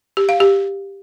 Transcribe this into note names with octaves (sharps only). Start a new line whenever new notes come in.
G4
F5
G4